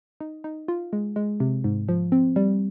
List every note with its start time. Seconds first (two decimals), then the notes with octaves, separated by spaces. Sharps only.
0.20 D#4
0.44 D#4
0.68 F4
0.93 G#3
1.16 G#3
1.40 C3
1.64 G#2
1.89 F3
2.12 C4
2.36 G3